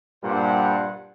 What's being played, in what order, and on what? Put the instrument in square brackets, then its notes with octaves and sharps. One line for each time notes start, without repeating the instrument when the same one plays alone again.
[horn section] G2 A#2 G3 C5 F#5